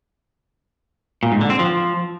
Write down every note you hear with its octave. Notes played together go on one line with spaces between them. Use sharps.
A#2
G#2
D3
C4
F3